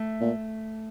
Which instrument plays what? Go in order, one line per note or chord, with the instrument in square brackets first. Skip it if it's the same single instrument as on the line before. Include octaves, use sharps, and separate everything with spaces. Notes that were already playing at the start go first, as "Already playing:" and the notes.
Already playing: [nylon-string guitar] A3
[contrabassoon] A#2